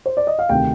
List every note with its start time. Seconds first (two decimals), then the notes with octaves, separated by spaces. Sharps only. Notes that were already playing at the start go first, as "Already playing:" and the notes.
0.06 C5
0.17 D5
0.27 D#5
0.39 F5
0.49 D2 C3 D#3 G5